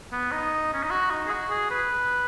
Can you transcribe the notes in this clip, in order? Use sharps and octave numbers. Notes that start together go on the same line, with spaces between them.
B3
D#4
C#4
D#4
F#4
D#4
G#4
F#4
G#4
B4